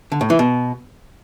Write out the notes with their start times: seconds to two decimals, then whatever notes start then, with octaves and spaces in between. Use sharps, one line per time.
0.12 D3
0.21 A2
0.30 E3
0.39 B2